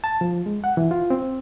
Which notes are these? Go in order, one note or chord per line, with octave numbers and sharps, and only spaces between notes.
A5
F3
G#3
F#5
E3
F4
C4